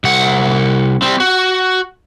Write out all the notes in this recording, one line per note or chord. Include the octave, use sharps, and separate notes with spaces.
C2 F#5
G3 C4
F#4